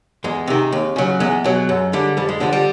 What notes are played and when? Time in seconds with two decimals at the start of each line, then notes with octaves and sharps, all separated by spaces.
0.24 E2 G#3
0.47 C3 D#3
0.72 D#2
0.96 C#3 F#3
1.20 E2 G#3
1.44 B2 F#3
1.69 F#2
1.93 D3 G3
2.17 F2 G3
2.29 G#3
2.40 D3 F3 G3
2.53 G3